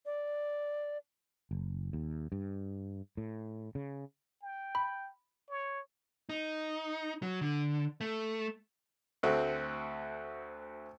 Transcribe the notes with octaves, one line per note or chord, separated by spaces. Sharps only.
D5
F#1
D#2
G2
A2
C#3
G5
B5
C#5
D#4
F#3
D3
A3
D2 A3 C4 F#4